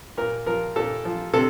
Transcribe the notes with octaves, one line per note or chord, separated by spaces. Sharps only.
A#2 A#4
F3 A#4
A#2 A4
F3
C3 A4